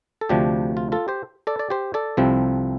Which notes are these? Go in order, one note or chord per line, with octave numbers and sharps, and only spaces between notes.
A4
D2 C3 F3 D4 G4
F4
F4 A4
G4 C5
A4 D5
D5
G4 C5
A4 D5
C2 C3 F3 C4